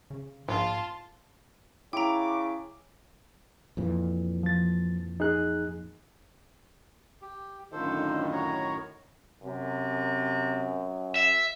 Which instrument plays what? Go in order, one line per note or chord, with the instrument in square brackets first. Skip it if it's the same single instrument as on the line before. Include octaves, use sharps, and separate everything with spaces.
[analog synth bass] C#3
[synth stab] A#1 [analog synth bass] G#2 [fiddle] F4 [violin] A5 C6
[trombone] C#3 [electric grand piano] E4 [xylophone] G5 A#5 [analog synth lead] D6
[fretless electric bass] F2 A#2 E3
[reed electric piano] F3 A6
D#4 G#4 F#6
[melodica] G4
[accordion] F#2 A2 D#3 [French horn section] D3 D#4 F4 [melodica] A4 C5
[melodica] F#4 C#5 A#5
[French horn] F#2 [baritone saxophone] C3
[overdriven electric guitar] E5